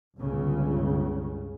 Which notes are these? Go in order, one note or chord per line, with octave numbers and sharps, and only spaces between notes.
G1 C#2 C#3